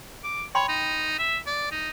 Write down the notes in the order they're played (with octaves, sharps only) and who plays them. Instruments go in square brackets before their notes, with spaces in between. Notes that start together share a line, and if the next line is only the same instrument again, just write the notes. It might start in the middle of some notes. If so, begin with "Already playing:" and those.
[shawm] D6
[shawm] C#5 [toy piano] G5 B5 C6
[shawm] D#4
E5
D5
D#4